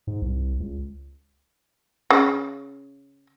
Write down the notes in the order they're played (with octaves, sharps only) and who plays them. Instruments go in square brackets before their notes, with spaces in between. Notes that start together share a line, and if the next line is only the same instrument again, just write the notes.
[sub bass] G#2
C2
C#2
[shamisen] C#3